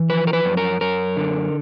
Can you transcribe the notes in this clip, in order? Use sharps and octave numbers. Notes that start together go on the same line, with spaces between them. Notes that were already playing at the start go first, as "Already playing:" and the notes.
Already playing: E3
F3 B4
A#4
B4
F#2
A#4
F#2 A#4
D3